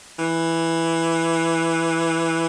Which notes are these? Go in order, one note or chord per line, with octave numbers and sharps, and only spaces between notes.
E3